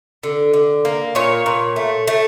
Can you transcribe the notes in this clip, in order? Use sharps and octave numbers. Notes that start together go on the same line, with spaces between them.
D3
D3
A#3
A#2 C#5
A#2
A3
A3